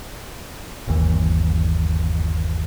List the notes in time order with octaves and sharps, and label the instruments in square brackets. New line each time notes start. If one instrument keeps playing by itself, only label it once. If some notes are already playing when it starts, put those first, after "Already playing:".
[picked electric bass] G1 D#2 E3